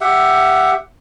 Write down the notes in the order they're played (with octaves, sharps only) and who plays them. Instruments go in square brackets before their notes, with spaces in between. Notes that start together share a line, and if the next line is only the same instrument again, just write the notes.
[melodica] G4 E5 F#5